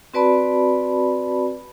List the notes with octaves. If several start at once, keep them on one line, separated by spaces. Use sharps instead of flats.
C4 F#4 B4 D5 A5 B5